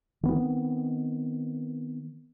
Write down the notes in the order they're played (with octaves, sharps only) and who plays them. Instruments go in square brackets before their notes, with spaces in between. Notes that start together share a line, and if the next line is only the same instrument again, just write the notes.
[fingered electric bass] D#3 B3 C4